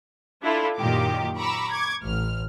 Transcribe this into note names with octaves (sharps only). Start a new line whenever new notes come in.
D4 E4 F4 A4
F#2 A#2 D#3 G4 D6
A#5 B5 C#6 D6 E6
C#6 D6 G#6
A1 F6